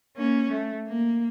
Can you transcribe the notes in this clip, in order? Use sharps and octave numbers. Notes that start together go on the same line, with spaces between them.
A#3 C#4
A3
A#3